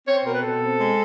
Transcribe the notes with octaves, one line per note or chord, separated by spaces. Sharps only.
C4 C#5
C5
B2 A#4
B4
B2 A4
C4
G#3